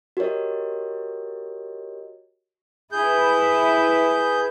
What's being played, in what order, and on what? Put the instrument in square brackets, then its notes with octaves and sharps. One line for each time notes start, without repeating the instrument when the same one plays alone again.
[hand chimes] F#4 G4 A#4 C#5 D#5
[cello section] E4 B4 [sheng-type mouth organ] G#4 G6